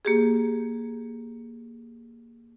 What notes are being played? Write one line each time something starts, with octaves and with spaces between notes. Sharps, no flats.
A#3 G4 G#4